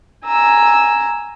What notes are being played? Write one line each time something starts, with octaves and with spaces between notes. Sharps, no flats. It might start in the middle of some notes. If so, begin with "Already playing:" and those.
G#5 A#5 E6